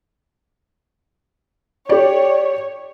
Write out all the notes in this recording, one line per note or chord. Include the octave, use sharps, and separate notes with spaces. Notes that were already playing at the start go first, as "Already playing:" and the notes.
G4 C#5 D5